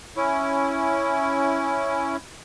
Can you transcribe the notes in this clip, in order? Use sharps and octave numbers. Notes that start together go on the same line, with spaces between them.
C#4 E4